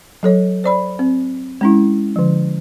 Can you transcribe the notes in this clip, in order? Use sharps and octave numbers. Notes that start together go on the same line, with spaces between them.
F#3 A4 C#5
C5 D5 B5
C4
G#3 C#4 E4
E4
D3 F3